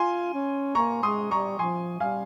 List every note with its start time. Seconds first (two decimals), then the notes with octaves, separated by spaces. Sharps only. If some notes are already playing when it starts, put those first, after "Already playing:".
Already playing: F4 G#5 C6
0.34 C#4
0.75 A#3 A#5 C#6
1.03 G#3 C6 D#6
1.31 G3 A#5 C#6
1.59 F3 G#5 C6
2.00 G3 F5 G#5